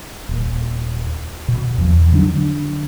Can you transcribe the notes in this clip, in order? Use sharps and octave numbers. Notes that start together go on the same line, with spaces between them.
D#1
B2
E2 F3
D3 F#3 D4